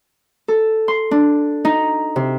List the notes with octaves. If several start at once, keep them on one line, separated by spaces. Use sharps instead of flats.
A4
C6
D4
D#4
C3